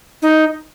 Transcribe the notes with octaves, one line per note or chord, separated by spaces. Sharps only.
D#4